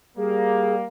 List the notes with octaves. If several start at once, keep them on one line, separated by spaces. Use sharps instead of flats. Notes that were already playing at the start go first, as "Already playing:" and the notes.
G3 A#3 G#4